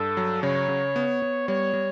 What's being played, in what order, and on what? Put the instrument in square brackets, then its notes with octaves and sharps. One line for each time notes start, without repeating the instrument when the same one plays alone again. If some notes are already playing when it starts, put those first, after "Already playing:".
Already playing: [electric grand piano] G2 [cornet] A4
[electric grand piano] F#3
[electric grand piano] C#3 [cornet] C#5
[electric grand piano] C#3
B3
B3
[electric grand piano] G3 [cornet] C#5
[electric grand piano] G3